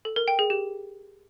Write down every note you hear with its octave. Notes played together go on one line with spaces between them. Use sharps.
A4
A#4
G5
G#4
G4